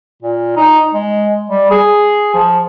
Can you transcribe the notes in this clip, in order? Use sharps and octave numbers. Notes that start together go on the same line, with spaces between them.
A#2
D#4
G#3
G3
G#4
F3